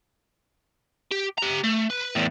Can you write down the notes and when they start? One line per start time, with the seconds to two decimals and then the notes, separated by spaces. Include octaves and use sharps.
1.11 G4
1.38 G4 A#5
1.64 A3
1.90 B4
2.15 E2 A2